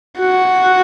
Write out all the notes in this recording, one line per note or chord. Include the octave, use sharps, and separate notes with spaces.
F#4